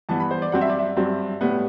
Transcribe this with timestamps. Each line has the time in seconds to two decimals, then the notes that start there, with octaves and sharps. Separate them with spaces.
0.09 G2 E3 B3 A5
0.20 B5
0.31 C5
0.42 D5
0.52 G2 F#3 C4 F#5
0.61 E5
0.70 D5
0.79 E5
0.97 G2 F#3 C4
1.41 A2 G3 B3